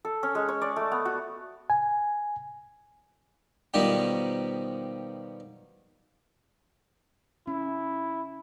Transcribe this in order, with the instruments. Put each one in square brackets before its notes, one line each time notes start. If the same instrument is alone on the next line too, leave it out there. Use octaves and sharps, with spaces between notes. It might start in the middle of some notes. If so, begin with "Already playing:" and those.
[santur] A4
C#4
G#3
C#5
D5
A3
B3
F#4
[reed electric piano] G#5
[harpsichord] B2 D#3 F3 G3 D#4 G4
[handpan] C#4 [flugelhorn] E4